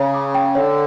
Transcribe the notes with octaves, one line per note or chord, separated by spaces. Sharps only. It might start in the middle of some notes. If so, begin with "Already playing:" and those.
Already playing: C#3 C#5 A#5
D6
G5
D3 C#5